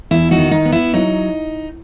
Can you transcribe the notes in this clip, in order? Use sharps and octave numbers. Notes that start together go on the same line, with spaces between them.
E2 E4
D#4 F#4
D#3
D#4
B3
E4
F#3 D#4